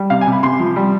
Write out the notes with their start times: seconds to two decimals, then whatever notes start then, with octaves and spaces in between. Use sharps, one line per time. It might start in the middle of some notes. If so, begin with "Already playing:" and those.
Already playing: G3
0.10 C3 F5
0.21 G#5
0.27 C3
0.32 B5
0.43 C3 C6
0.60 F3
0.76 G3